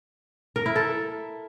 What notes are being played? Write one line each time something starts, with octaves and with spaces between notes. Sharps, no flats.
A#4
E4
A4